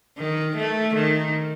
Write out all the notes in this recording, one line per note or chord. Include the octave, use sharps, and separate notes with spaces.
D#3
A3
D#3